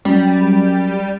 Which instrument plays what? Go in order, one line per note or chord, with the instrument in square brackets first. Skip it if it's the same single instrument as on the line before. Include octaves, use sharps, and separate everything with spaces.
[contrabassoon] F#2 [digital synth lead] G3